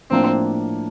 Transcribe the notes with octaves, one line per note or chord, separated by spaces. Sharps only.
A2 F3 A#3 C4 D4